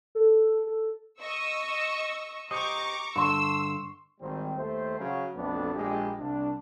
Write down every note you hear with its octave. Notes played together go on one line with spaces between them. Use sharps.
A4
A4
D#5 C#6 E6
G4 C5 D#5 A#5 C#6 D6
G2 D3 C6 C#6 E6
G#1 D#3 G3 C4
D#2 A3 C5
C#3 F#3
B1 F2 A3 B3 D4
A#1 G#3 D4 G4
C2 D4